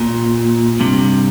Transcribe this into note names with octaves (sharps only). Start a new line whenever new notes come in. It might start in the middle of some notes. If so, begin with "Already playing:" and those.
Already playing: A#2
G2 C3